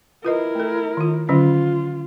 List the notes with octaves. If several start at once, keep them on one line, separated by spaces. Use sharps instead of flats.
E4 F4 A#4 B4 D#5
A3 A4
D#3 F4
D3 F#3 C#4 F4